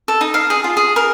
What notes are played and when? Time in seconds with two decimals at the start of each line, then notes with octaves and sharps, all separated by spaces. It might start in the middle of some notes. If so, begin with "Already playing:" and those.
0.08 A4
0.21 D#4
0.34 F5
0.50 G#4
0.64 F4
0.77 G#4
0.96 A#4